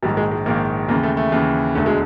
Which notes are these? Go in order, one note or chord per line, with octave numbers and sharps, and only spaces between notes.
A#1 G#2 D#3 G3
G#3
G#3
A#1 G#2 D#3 A#3
D#2 C#3 E3 A#3
A3
A3
D#2 C#3 E3
E1 D2 D3 A3
G#3